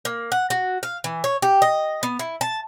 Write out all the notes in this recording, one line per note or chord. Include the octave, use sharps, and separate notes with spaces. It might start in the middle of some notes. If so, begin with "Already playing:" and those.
A#3
F#5
F#4
F5
E3
C#5
G4
D#5
B3
E4
A5